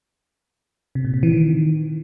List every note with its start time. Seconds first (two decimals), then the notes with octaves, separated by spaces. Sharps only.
0.95 C3
1.05 A#2
1.14 C3
1.23 E3
1.32 D#3